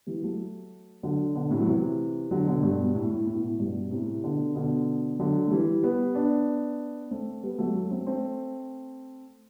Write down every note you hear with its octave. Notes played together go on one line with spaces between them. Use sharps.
E3 G3
F#3 A3
D3 F#3
B2 D3
A2 C3
F#3
C3 E3
D3 F#3
B2 D3
G2 B2
B2
A2
A2
A2
B2
A2
G2 B2
A2 C3
B2 D3
B2 D3
D3 F#3
A3
E3 G3
G3 B3
B3 D4
A3 C4
G3 B3
F#3 A3
F#3 A3
A3 C4
A3 C4